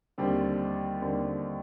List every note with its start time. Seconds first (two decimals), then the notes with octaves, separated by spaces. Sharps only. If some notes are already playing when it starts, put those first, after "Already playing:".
0.18 D#2 D3 G3 C4
1.01 D#2 D3 G3 C4